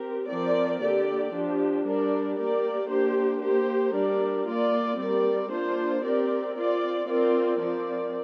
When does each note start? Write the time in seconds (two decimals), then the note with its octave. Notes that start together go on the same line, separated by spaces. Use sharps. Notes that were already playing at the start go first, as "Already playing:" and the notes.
Already playing: C4 G4 A#4
0.28 F3 C4 A#4 D5
0.81 D3 A#3 G4 D5
1.33 F3 D4 G4
1.85 G3 D4 A#4 D5
2.38 A#3 G4 A#4 D5
2.90 A#3 D4 G4 C5
3.43 A#3 G4 C5
3.94 G3 D4 A#4 D5
4.46 A#3 F4 D5
4.99 G3 C4 A#4 D5
5.52 A#3 D4 F4 C5
6.04 C4 G4 A#4 D5
6.56 C4 F4 D5
7.08 C4 F4 A#4 D5
7.60 F3 C4 A#4 D5